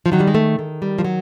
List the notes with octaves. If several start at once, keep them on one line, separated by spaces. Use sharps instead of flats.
F3
D#3 F#3
G3
G#3
A3
D#3
G3
F3
F#3